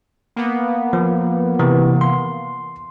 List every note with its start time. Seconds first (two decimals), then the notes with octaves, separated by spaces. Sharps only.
0.36 A#3 B3
0.93 F3
1.59 C3 E3
2.01 C6